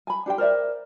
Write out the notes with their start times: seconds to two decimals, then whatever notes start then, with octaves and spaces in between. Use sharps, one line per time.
0.07 G#5 B5
0.26 D4 G4 C5 G5
0.38 A#4 C5 D5 E5